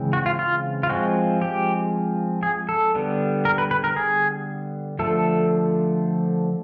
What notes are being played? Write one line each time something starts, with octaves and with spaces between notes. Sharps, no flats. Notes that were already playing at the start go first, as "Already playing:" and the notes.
Already playing: C#3 E3 G#3 C4
F#4
F4
F4
F4
F3 G#3 C4 F#4
G4
G#4
A4
D3 G3 B3
A#4
B4
B4
A#4
G#4
D3 F3 A3 A4